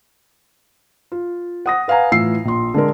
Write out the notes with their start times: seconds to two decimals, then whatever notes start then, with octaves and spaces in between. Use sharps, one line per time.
1.12 F4
1.66 F#5 D#6 A#6
1.88 B4 F5 F#5 G#5 A#5
2.12 A2 E3 F4 E6 C7
2.45 A#1 C6
2.74 D3 G#3 A#4